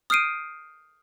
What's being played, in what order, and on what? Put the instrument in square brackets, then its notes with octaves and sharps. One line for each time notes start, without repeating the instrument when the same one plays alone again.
[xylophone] D#6 F6 G6 C7 D7 D#7